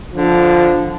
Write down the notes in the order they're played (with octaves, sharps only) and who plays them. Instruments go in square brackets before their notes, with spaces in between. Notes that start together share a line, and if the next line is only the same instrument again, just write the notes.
[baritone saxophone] D3 [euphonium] F3